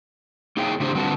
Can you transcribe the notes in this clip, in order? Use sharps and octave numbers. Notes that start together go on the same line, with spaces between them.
A#3 D#4 G#4 C#5 G5
A2 C#3 D4 G4 A#4 C5
D3 G3 C4 F#4 B4 A5